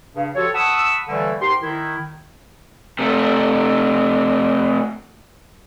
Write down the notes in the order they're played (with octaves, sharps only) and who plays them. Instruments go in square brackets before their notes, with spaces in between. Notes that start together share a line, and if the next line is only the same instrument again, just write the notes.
[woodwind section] G2 C#3
F3 F#4 G4 A4 C#5
F#5 A5 B5 C#6 D#6 E6
D#2 D3 E3 G3 A3
G#2 G4 A#4 C6
D#3 E4
[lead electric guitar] C3 A3